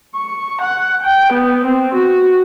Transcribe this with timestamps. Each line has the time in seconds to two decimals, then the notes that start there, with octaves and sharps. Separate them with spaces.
0.15 C#6
0.62 F#5
1.03 G5
1.33 B3
1.65 C4
1.95 F#4